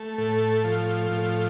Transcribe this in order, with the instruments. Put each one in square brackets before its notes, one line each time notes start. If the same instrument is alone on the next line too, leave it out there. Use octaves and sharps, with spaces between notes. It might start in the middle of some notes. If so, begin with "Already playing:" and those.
Already playing: [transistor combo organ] A3
A2
F3
A2